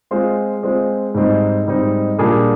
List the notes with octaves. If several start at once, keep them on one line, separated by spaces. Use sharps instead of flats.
G#3 C4 F4 C5
G#3 C4 F4 C5
G#2 G3 C4 D#4
G#2 G3 C4 D#4
A#2 G3 D4 G#4